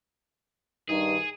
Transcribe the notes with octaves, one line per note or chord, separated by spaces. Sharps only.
G2 D#3 G#4